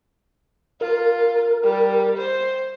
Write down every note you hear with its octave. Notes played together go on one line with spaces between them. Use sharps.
F4 A#4
G3
C5